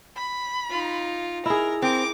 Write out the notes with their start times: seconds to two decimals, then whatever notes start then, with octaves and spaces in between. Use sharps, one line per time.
0.16 B5
0.70 D#4 F4
1.46 E4 G#4 A#4 A#5
1.82 C4 A#4 D6